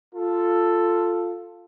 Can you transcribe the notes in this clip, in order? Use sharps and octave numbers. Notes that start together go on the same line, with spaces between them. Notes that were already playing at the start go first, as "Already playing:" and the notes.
F4 A4